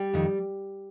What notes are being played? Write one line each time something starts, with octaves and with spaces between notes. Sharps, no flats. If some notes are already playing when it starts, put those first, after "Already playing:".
Already playing: G3
F2 D#3